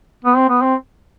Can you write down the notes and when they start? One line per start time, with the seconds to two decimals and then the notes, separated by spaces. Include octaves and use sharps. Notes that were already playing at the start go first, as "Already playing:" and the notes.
0.25 B3
0.38 C4
0.49 B3
0.62 C4